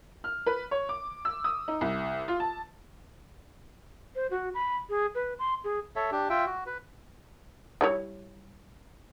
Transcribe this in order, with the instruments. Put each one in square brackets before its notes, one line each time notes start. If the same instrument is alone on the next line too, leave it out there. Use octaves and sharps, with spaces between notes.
[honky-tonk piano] F6
B4
C#5
D6
E6
D#6
D#4
C2
F4
A5
[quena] C5
F#4
B5
G#4
B4
C6
G#4
[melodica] A4 C#5 E5
D4 G4
F4 E5 G5
F#4
B4
[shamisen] G3 E4 C#5